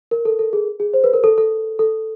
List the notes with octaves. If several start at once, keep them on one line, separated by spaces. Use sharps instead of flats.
A#4
A4
A4
G#4
G#4
C5
B4
A#4
A4
A4
A4